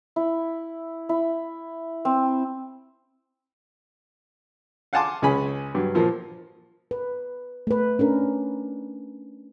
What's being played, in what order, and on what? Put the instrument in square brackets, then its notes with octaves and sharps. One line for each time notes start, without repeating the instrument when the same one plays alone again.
[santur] E4
E4
C4
[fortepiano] F5 F#5 G#5 A5 C6 D6
C#2 C#4 G#4 G#5 B5
G2 F#3
A#2 F3 A#3
[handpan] B4
A3 B4
C#4 D4 A#4